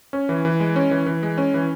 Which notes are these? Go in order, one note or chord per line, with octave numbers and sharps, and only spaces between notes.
C#4
E3
E3
G#3
C#4
E3
E3
G#3
C#4
E3